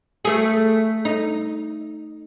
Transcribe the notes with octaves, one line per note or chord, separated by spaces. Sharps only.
A3 G#4
D#4